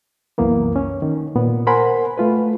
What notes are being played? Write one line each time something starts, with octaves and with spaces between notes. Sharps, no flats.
C2 F#2 E3 A#3 B3
C#4
D#3
A#2 B3
A#4 C5 F#5 G#5 B5 C6
A3 F4 B4